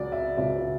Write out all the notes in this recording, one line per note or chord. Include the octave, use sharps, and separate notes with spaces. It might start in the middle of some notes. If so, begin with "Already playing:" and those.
Already playing: C#2 C#3 F#3 D5
E5
C#2 C#3 F#3 E5